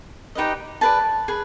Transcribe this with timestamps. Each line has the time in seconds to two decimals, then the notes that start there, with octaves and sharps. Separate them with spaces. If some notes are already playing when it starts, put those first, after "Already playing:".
0.35 D#4 G4 B4 D#5
0.81 G#4 B4 D5 A5
1.28 G#4 B4